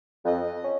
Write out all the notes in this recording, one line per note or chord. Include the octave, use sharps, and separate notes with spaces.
F2 D#5
C#4